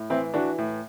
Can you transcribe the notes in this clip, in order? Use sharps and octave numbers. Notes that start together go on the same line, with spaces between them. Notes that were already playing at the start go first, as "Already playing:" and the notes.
Already playing: A2
E3 C4 E4
E3 D4 F#4
A2